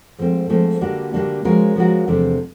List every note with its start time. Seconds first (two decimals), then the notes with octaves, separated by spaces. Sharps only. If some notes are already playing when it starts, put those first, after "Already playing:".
0.18 G#2 F3 A3 C4
0.49 G#2 F3 A3 C4
0.81 D3 G3 A#3 D4 F#4
1.13 D3 G3 A#3 D4 F#4
1.44 F3 G#3 C#4 F#4 A#4
1.76 F3 G#3 C#4 F#4 A#4
2.08 E2 C3 F3 A3 D4